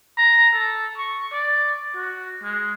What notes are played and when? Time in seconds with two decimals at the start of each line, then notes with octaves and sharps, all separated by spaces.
0.17 A#5
0.53 A4
0.97 C#6
1.32 D5
1.96 F#4
2.43 G#3